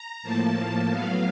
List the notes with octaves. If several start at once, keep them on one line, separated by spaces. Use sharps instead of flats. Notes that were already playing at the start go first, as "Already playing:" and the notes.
Already playing: A#5
A2 F3 A#3 A5
A2 F#3 B3 F5